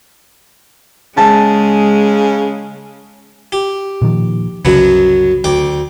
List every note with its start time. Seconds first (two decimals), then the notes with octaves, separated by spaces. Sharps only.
1.17 C#3 G#3 A5
3.52 G4
4.02 A#2 D#3 F3
4.65 C2 F#2 C#3 F#3 B3
5.44 D2 G5 D6